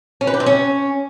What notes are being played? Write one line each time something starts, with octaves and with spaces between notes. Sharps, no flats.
C#4
B4
G4
C4
C#4